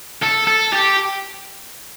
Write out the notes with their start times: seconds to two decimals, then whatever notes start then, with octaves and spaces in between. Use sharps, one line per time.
0.23 A4
0.47 A4
0.73 G4